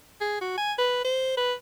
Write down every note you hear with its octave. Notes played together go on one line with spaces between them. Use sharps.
G#4
F#4
G#5
B4
C5
B4